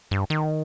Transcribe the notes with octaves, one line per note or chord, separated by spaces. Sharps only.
G2
D#3